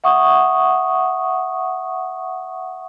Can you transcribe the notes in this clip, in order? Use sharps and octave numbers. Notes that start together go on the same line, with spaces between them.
E5 F#5 C#6 D#6